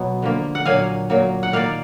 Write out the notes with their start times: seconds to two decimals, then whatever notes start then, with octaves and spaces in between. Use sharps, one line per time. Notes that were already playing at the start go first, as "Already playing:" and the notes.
Already playing: B2 F#3 B3
0.22 D3 F3 A#3
0.55 F#5
0.65 A#2 F#3 A#3 F5 G#5
1.10 A#2 F#3 A#3
1.43 F#5
1.52 D#3 A#3 D5 F5